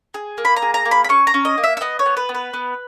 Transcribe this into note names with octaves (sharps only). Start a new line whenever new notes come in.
G#4
A#3
B5
A#5
G#4
A#5
A#3
B5
B5
C#4 C#6
A#5
C#4
D#5
A#3
E5
E5
B3 D#5
C#5
B3
B4
B3
B4
B3